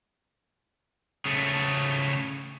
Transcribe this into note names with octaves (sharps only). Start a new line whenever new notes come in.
C#3 A3